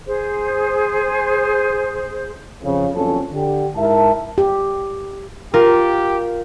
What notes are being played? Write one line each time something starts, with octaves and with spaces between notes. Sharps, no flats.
G#4 C5
F2 C#3
F#1 G2 F3 C4 C#4 A4
D3 G4
G#2 E4 A#4 E5 A5
G4
F4 G4 A#4